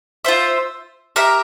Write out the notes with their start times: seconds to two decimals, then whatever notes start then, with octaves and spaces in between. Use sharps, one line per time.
0.25 F4 C5 E5
1.16 G4 A#4 E5